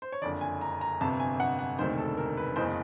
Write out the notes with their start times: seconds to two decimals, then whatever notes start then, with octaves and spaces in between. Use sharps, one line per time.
0.02 C5
0.12 C#5
0.22 F#1 F2 D3 D5
0.41 G#5
0.61 A#5
0.81 A#5
1.01 G1 F2 C3 A5
1.20 G#5
1.40 F#5
1.59 F#5
1.78 E1 D2 C3 D#3 C5
1.98 A4
2.17 A#4
2.37 B4
2.56 F#1 E2 C#3 E3 G#3 C5